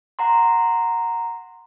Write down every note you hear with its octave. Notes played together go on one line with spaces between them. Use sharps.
F#5 A#5 C6